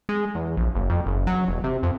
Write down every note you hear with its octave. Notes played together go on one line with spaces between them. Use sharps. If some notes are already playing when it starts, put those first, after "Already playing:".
G#3
E2
A#1
F#1
F2
F#1
F#3
E1
C3
F2